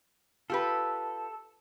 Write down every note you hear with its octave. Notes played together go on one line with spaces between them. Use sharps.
F4 G4 A4 B4